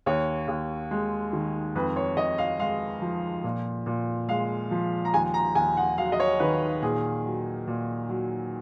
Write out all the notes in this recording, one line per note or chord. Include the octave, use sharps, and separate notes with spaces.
D#2 C#5
D#2
G#3
D#3
F2 B4
C#5
F2 D#5
F5
G#3 F5
F3
A#2
A#2
G#3 F5
F3
A#5
D#2 G#5
A#5
D#2 G#5
F#5
F#3 F5
D#5
C#5
D#3 B4
A#2 G#4
F#3
A#2
F#3